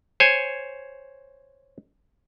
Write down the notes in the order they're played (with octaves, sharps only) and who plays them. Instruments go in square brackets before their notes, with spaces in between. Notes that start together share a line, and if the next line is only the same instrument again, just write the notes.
[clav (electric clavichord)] C5 C#5 G#5